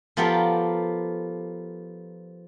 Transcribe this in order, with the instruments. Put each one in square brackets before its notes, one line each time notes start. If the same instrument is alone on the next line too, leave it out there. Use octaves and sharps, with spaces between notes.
[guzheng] F3 B3 F4 G4 A4 A#4